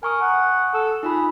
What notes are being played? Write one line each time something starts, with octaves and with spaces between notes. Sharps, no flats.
A#4 G#5 C#6 D#6
F#5
A4
D#4 F4 G#4 B5